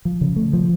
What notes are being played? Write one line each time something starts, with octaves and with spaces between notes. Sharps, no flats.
F3
C#3
A3
F3